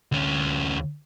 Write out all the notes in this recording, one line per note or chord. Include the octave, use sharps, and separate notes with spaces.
D2 C#4